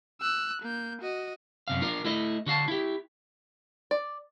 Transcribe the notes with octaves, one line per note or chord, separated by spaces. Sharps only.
E6 F#6
A#3 G6
F#4 D#5
F#2 C3 F5
D4 F4 A#4
A3 E4 D#5
D3 F#4 F5 A5
E4 G4
D5